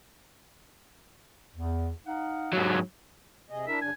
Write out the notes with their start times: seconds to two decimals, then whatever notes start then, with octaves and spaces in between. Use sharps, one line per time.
1.56 E2
2.07 D#4 F5 F#5
2.53 G#2 F#3
3.50 C3 G#4 D#5
3.67 D4 E4 A#4 E5
3.82 F#2 C#3 D4 G#5